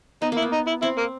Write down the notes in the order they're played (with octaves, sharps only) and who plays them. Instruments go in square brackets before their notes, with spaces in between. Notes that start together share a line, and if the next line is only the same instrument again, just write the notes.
[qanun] B3 [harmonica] D#4
[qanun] A#3
[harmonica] E4
[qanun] B3
[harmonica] D#4
E4
[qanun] C4 [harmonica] E4
[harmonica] A#3